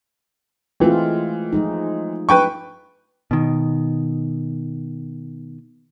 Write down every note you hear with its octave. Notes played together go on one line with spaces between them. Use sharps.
E3 G#3 A3 C4 F4
F3 G#3 D#4
B4 G5 C#6
B2 D#3